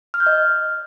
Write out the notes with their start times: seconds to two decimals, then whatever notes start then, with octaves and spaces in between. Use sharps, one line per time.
0.14 F6
0.20 G6
0.26 D#5